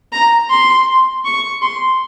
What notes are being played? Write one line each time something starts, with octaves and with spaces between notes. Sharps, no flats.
A#5
C6
C#6
C6